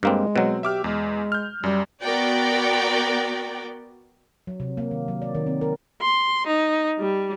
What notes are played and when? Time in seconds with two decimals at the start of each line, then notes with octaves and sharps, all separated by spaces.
0.03 G2 G#3 A#3 C4
0.36 B2 F#3 C4
0.63 G4 E5 D6 F6
0.84 E2 G#3
1.32 F6 G6
1.63 F#2 G3
2.03 B3 F#4 A#4 D5 G5
4.47 F#3
4.60 C3
4.77 A#3
4.91 D#3
5.08 F#3
5.22 D5
5.35 D#3
5.46 C4
5.61 A#4
6.01 C6
6.47 D#4
6.99 G3